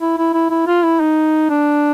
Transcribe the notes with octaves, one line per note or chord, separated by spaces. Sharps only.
E4
E4
E4
E4
F4
E4
D#4
D4